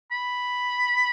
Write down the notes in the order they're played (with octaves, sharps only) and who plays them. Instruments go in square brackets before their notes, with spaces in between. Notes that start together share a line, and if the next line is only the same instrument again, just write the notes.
[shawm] B5